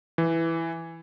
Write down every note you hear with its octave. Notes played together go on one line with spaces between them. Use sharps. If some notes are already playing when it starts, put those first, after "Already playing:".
E3